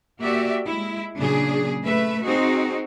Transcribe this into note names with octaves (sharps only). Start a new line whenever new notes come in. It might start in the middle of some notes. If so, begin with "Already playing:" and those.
A#3 F#4 G4 D5 E5
G#3 E4
A#2 C#3 F#3 D4 G#4
A3 B4 E5
C4 D#4 F#4 G#4